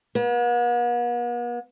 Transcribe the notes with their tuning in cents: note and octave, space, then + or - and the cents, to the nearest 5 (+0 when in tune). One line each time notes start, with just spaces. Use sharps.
B3 -45